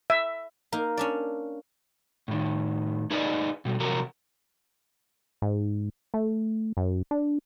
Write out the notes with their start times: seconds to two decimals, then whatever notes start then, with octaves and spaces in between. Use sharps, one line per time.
0.10 E5
0.72 A#3 D#4 A#4
0.97 C#4 D4 D5
2.28 A2 D#3
3.11 D#4 G#4 B4 D5 D#5
3.65 B2 G3
3.80 C3 F3 F#3 F#4 A#4
5.42 G#2
6.14 A3
6.77 F#2
7.11 D4